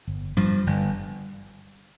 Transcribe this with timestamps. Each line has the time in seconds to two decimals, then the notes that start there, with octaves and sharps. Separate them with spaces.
0.07 G1
0.37 G2 F3
0.67 G1